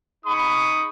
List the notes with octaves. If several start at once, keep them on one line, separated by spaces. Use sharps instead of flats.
D#4 G#4 B5 C#6 D#6